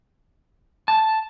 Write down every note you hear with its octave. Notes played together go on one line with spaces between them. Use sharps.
A5